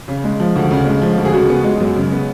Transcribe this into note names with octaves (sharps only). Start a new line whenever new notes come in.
C#3
G#3
F3
D2
C#3
G#3
F3
D2
G#4
C#3 F#4
B3
G#3
F#2
C#3
B3